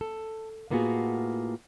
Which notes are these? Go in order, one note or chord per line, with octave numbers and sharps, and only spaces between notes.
A4
A2 A#3 B3 F4 F#4 G#4